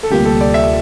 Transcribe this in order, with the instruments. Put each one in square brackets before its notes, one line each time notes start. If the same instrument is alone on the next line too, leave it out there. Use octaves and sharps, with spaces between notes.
[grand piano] A4
[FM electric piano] D2 C3 G3 A#3 F4 [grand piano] G4
[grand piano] A4
D5
E5